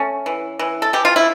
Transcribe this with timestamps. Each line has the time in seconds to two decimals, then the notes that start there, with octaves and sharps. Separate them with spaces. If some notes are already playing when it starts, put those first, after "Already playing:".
Already playing: A3 C#4
0.26 E3
0.59 E3
0.82 A4
0.93 E3 G4
1.05 F4
1.16 E4